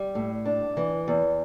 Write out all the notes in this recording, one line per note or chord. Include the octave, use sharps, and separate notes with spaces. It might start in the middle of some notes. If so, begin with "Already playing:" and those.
Already playing: G3
A2
D4
E3
E2